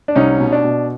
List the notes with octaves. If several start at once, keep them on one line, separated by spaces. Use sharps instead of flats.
D4
C2 C#4 D#4
B2
D4
B2